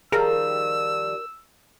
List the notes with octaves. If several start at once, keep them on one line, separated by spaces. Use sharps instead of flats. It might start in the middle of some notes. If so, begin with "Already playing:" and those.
D#3 F3 G3 G#4 A#4 E6